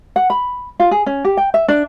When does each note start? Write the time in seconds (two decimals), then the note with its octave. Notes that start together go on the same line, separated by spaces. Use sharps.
0.16 F#5
0.30 B5
0.80 F4
0.91 G#4
1.06 C#4
1.24 G4
1.37 G5
1.54 E5
1.68 D4